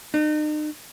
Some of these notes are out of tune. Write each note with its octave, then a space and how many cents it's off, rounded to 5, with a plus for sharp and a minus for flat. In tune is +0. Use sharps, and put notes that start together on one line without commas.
D#4 -40